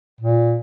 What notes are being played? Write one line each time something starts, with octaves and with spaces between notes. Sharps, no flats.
A#2